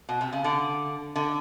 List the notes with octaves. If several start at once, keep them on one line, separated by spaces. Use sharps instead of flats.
B2
C3
C#3
D3
D3